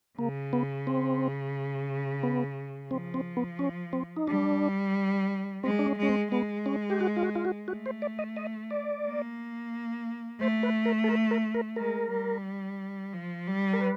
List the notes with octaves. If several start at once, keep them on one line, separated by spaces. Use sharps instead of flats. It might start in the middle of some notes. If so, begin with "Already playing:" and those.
C#3 A#3
B3
C4
B3
F3 C4
C4
B3
C#4
C4
D#4
G3 D4
G#3 C4
D4
C#4
G#3 C#4
C4
G#3 B3
C#4
G4
F#4
F4
F#4
F4
F#4
A3 F#4
C5
D5
D#5
D#5
D5
A#3
A3 C5
B4
A#4
A4
A#4
A#4
A#4
G#3 A#4
G3
F3
G3
A#4
B4